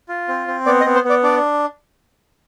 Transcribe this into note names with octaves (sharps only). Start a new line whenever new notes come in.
F4
C4
C4
B3 D5
D#5
B3
C5
B3 D5
D4 D5